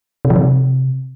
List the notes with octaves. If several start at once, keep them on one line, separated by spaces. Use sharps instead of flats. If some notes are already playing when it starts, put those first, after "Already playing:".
C3
F3
C3